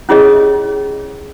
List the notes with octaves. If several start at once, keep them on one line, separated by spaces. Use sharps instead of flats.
C#4 E4 G4 G#4 C#5 D#5